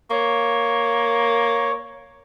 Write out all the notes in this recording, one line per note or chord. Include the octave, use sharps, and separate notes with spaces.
A#3 C#5